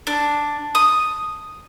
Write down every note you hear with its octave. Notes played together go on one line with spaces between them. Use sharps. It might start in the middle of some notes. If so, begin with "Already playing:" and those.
D4
D#6